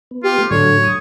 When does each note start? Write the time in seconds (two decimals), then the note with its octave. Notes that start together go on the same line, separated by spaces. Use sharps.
0.11 B3
0.24 F4 G4
0.39 A3 B3
0.51 A2 D3 F#3 C#5
0.83 D#6